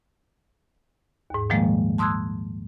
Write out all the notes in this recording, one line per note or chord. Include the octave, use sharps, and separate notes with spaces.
D#2 G#2
A#2 D#3 F3 G3 G#3 A#3
A5 C6 D#6 E6 F#6 G#6